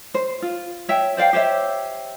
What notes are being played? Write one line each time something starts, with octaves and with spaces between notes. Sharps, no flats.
C5
F4
C#5 E5 G5
C5 D5 F5 G5
G4 C5 C#5 E5